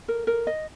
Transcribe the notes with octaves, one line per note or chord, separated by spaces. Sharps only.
A#4
A#4
D#5